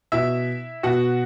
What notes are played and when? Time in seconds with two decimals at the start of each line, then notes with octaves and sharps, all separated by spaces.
0.12 B2 E4 E5
0.83 B2 F#4 F#5